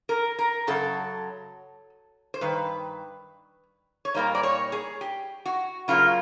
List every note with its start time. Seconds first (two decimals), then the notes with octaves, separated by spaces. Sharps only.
0.09 A#4
0.39 A#4
0.67 F#2 C#3 F#3 A4
2.34 C5
2.41 G2 D#3 B4
4.05 C#5
4.14 A#2 G3 A#3 D#4 C5
4.35 D5
4.43 C#5
4.72 G#4
5.01 G4
5.46 F#4
5.88 C#3 F#3 A#3 F4